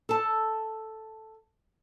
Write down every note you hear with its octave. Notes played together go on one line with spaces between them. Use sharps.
A4 A5